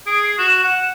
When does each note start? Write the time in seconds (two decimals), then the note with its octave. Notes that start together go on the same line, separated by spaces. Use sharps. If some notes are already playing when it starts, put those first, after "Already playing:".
0.06 G#4 D7
0.23 C7
0.38 F#4 E7
0.64 F#5